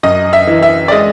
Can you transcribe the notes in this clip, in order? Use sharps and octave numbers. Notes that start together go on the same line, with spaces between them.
F#2 D#5
E5
E3
E5
D5
G#3 D#5